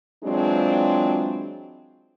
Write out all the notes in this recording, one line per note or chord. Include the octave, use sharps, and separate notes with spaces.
E3 F#3 G#3 C4 D4 F4